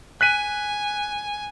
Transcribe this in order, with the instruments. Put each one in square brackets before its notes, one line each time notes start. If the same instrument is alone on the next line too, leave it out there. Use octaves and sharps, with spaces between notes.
[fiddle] G#5 [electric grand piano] F#6 B6 D#7